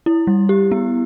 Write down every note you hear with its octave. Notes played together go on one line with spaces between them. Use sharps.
E4
G3
G4
B3